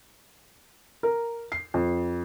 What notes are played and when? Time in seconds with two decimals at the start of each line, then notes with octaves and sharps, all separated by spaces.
1.03 A#4
1.52 C7
1.74 F2